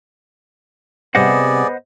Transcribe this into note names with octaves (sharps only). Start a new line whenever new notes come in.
C3 G3 B3 G#4 C5 D5 D#5 F#5